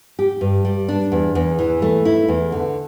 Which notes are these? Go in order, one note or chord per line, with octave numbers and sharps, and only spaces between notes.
G4
G2
G3
D4
E2
E2
E3
A3
E4
E2
D3